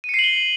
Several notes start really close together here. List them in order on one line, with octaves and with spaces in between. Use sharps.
D#7 C#7 C7 F#7 G7